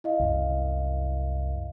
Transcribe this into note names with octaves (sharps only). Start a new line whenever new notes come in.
E4 D#5 F5
C2 F#2